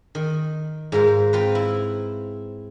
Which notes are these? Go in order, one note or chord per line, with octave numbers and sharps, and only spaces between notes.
D#3
G#2 F4 A#4 C5
C4 F4 B4
E4